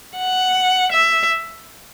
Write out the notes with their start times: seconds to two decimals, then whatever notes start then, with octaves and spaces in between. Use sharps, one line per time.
0.18 F#5
0.92 E5